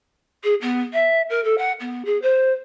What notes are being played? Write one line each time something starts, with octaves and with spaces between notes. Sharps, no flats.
G#4
B3
E5
A#4
A4
F#5
B3
G#4
C5